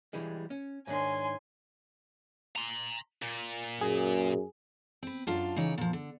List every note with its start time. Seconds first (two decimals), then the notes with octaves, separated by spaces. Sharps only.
0.13 E3 G3 G#3
0.50 C#4
0.87 G#2 D#3 D4 C#5 G#5 C6
2.56 A#5 C6
3.22 A#2
3.81 F#2 G#4
5.03 C4 B4
5.27 F#2 D4 F4 A4 F5
5.56 C#3 E3 D#4 C#5 D5
5.78 A#2 F3
5.93 D3